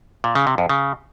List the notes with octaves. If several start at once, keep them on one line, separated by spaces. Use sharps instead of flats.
A#2
C#3
C3
F2
C#3